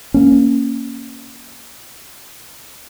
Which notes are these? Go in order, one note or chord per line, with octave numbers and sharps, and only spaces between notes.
A#3 C#4